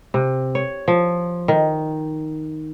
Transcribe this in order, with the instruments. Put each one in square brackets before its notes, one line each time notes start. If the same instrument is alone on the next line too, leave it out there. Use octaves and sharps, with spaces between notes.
[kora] C3
C#5
F3
D#3